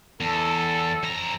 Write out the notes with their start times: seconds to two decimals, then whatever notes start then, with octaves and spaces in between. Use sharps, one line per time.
0.21 E2 A4
1.03 F2 A#5